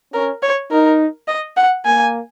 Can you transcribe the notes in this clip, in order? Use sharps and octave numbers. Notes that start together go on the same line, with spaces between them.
C#4 A#4
C#5
D#4 A#4
D#5
F#5
A#3 G#5